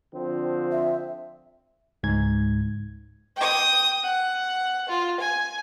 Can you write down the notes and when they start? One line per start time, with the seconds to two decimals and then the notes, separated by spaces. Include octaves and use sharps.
0.14 D3 F3 C4
0.72 E5
2.03 C#2 G#2 G#6
3.36 G5 D#6
4.03 F#5
4.89 F4
5.20 G#5